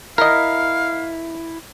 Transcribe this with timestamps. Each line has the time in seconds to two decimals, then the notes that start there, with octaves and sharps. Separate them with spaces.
0.18 E4 A#4 D#5 F5